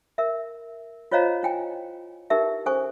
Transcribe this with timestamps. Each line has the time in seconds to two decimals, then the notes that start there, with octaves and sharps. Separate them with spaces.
0.18 A#4 E5
1.12 F4 C5 C#5 D#5 F5 A#5
1.43 E4 G5 G#5
2.30 D#4 E4 G4 A#4 B4 E5
2.66 C#4 A4 C5 G#5 C#6